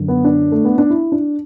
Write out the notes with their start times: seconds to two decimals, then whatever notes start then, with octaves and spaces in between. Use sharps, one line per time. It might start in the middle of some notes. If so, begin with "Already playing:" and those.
Already playing: F#2 D3
0.08 B3
0.24 D4
0.52 A3
0.64 B3
0.78 D4
0.90 E4
1.12 D4